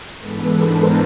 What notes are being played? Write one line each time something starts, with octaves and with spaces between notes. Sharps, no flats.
G#2 E3 G#3 B3 D4 A4 B4
A#4 C5